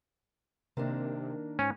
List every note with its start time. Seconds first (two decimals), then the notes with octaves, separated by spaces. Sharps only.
0.77 C3 D#3 A#3 D4
1.59 G#2 C#4